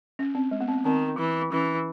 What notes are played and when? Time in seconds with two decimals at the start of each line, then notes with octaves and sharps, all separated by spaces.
0.19 C#4
0.35 C4
0.51 G#3
0.60 B3
0.68 C4
0.77 B3
0.85 D#3 C4
1.18 E3
1.52 E3 C#4